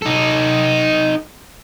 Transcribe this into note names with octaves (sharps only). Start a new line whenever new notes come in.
D#4 A4